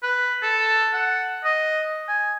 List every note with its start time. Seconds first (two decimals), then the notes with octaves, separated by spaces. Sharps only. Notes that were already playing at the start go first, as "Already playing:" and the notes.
0.03 B4
0.42 A4
0.93 F#5
1.44 D#5
2.08 G#5